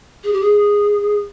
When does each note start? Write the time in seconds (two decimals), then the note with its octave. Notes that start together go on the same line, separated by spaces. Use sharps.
0.24 G#4
0.33 G4
0.41 G#4